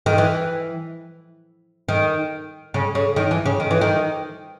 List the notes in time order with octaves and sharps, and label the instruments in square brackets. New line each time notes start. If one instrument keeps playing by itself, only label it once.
[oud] D#3
E3
D#3
C#3
C#3
D#3
E3
C#3
D#3
E3
D#3